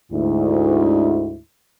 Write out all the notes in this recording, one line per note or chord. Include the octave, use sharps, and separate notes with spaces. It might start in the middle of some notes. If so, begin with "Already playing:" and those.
D2 G#2 E4